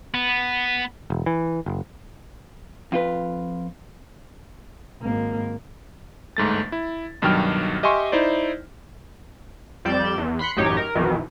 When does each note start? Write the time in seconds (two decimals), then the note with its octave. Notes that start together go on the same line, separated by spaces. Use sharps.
0.14 B3
1.10 E1
1.26 E3
1.66 F#1
2.92 F2 F4 B4
5.02 G#1 A#3
6.37 G1 G#2 A3 A6
6.72 E4
7.22 B1 G2 D#3 F#3 G5 F6
7.83 G4 D#5 E5 G#5 C6 C#6
8.12 D#4 E4 C5 D5
9.85 F2 G3 D5 G6 E7
10.18 E2
10.39 B5 C6 F#6 B6 C#7
10.57 A1 F#2 D#4 G4 C#5
10.77 A#4
10.95 B1 F2 B2 D#3 E3